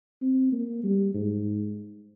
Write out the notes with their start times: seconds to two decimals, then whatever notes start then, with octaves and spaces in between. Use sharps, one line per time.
0.22 C4
0.52 A#3
0.84 G3
1.14 G#2